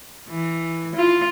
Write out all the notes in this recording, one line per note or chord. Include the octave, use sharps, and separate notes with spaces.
E3
F4